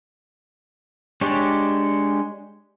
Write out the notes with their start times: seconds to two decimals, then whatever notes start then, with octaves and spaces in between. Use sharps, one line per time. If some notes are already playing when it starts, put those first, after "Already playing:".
1.21 G#3 D4 G4 C#5